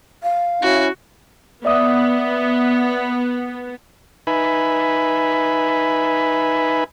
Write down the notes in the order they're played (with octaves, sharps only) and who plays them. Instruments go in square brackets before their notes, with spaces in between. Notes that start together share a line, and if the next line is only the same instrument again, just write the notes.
[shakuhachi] F5
[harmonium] C#4 E4 [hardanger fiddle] F#4
[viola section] B3 [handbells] D5 E5 D#6
[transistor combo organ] D#4 B4 E5 G#5 B5